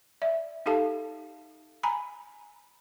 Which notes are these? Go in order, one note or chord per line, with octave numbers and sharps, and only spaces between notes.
D5 E5
D#4 G4 A4 F5 A5
G#5 A#5 B5